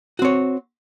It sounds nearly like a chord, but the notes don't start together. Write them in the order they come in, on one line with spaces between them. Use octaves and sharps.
F#4 C4 C#5